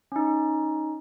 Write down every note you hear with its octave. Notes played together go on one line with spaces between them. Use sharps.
C#4 D#4